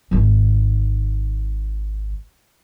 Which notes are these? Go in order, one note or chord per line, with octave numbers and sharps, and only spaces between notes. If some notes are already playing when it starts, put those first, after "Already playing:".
G#1 D#3